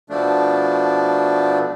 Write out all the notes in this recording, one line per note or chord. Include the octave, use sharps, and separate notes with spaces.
B2 F3 A3 D4